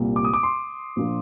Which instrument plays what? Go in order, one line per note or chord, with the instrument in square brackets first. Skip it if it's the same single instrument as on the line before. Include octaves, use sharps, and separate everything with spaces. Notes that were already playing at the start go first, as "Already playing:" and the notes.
Already playing: [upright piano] C2 A#2 G3 A#3
D6
D#6
D6
C6
A#1 A#2 F3 A#3